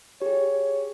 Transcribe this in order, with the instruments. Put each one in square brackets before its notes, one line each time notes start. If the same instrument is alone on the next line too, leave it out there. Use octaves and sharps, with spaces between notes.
[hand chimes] G4 G#4 [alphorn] C#5